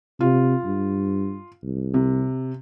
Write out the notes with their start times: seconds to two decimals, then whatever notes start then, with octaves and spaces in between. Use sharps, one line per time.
0.21 C3 F4
0.65 G2
1.63 C2
1.94 C3